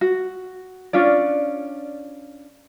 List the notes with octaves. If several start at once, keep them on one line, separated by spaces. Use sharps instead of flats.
F#4
C#4 D4 F4 D5